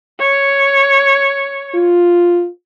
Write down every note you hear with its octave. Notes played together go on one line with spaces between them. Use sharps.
C#5
F4